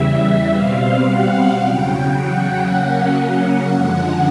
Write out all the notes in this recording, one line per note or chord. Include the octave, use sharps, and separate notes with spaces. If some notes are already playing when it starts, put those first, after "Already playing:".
Already playing: E2 C#3 E3 G3 E5
B2 G3 C4 F5
F#5
E2 C#3 F#3 G5
F#5
C#3 F#3 A#3 C#4
F#2 D3 F3 G#3